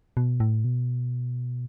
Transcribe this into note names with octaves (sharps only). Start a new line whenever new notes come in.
B2
A2
B2